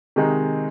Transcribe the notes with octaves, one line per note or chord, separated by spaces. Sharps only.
C3 D#3 G#3 D#4